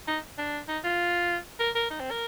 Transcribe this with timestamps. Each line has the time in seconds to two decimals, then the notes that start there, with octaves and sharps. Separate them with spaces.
0.08 D#4
0.38 D4
0.68 D#4
0.84 F4
1.60 A#4
1.75 A#4
1.90 D#4
2.00 C4
2.11 A#4